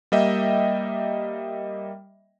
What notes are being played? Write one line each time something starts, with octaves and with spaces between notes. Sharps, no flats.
G3 A#3 D#5 E5 G5